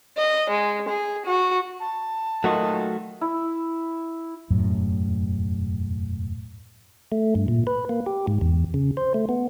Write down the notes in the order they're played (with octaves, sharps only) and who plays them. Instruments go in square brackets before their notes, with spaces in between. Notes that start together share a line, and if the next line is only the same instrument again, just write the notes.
[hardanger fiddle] D#5
G#3
G#4
F#4
[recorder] A5
[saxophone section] A#2 D#3 D#4 [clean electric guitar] F#3 A3 F#4
[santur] E4
[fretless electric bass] E1 F#2 A2 F#3
[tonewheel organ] A3
G2
A#2
B4
A#3
G4
G#2
E2
C#3
C5
A3
B3